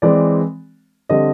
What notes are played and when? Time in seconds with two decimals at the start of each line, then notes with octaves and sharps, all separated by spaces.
0.02 E3 G#3 C4 D5
1.09 D3 G3 C4 D#5